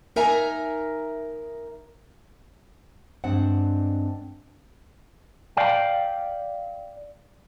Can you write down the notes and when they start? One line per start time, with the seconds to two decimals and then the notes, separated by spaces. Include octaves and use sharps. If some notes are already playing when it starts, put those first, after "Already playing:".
0.16 D#4 A#4 E5 G#5 A#5
3.24 G2 G#3 C4 D4 C5 F#5
5.57 D5 F5 G5